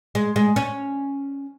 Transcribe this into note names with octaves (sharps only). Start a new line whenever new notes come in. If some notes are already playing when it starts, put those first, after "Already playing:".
G#3
G#3
C#4